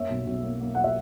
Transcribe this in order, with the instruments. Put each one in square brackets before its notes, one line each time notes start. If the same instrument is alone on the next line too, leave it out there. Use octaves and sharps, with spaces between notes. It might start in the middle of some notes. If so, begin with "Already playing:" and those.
Already playing: [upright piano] F#2 A#3 C#5 E5
B1
B1
A#3
A#3
F#5
E5